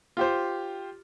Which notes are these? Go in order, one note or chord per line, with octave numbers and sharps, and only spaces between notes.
F4 G4 C5